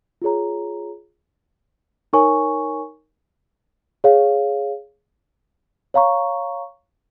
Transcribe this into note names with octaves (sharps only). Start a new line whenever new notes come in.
F4 G#4 C#5 A#5
D#4 A#4 C#5 G#5 C#6
G#4 C#5 F5
C#5 F5 A#5 C#6